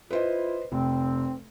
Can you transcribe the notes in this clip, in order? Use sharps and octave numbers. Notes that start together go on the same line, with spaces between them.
E4 F4 B4 C5 D#5
F1 C4